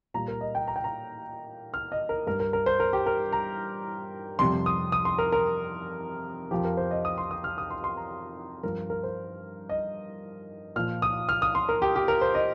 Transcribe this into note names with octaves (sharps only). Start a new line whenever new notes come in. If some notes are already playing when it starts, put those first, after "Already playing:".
A#2 G3 A#5
A#4
D#5
G5
A#5
G5
A#5
F6
D#5
A#4
G2 G3 A#4
A#4
A#4
C5
A#4
G4
A#4
A#5
F2 C3 G3 C6
D#6
D#6
C6
A#4
A#4
F2 F3 G4
A#4
C5
D#5
D#6
C6
D#6
F6
D#6
C6
C6
A#5
G2 F3 A#4
A#4
C5
D#5
A#2 F3 F6
D#6
F6
D#6
C6
A#4
G4
G4
A#4
C5
D#5